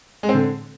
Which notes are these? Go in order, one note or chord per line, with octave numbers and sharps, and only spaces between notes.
G#3
C4
D3